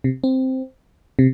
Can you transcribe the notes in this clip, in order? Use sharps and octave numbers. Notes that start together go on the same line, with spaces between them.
C3
C4
C3